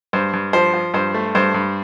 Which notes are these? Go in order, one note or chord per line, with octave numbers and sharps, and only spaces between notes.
G2 C5
G2
F3 C5
F3
G2 C5
A3
G2 C5
G2